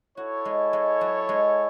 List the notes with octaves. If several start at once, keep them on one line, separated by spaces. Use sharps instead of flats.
E4 F#4 A4 C#5
G#3
G#3
F#3
G#3